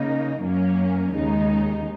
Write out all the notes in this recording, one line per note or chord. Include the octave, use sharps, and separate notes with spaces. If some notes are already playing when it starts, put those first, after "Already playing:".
Already playing: C#3 A#3 D#4
F#2 F#3 A#3 C#4
D#2 C#3 G#3 D#4